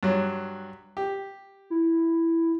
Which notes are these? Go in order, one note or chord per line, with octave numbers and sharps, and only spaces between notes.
G2 F#3
G4
E4